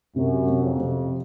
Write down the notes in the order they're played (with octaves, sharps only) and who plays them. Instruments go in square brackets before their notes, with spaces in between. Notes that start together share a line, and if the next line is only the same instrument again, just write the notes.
[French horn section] F#2 [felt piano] C3
[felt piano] C3
[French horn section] F2
[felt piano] C3